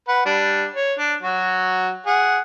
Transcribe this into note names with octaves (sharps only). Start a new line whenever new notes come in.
B4 F#5
G3 D4
C#5
D4
F#3 F#4
G#4 F#5